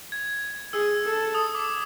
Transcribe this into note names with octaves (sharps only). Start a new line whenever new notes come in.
G#6
G#4 E6
A4
D#6
D6